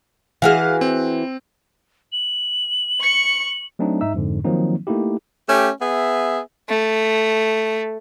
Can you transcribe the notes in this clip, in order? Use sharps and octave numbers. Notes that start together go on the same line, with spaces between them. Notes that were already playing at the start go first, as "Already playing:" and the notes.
E3 F#4 G#4 F5 F6
C4
F#7
C#6 C#7
F#3 A3 C4 D4 D#4
G#2 D#4 E5 E6
F2 G#2 D3
D#3 F3 F#3 A#3 C4 D#4
A3 A#3 D#4 E4 G4
A3 C#4 G4
B3 G#4 E5
A3